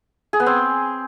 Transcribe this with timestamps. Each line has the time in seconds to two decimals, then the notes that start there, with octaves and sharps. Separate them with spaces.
0.33 G#4
0.40 B3
0.46 C4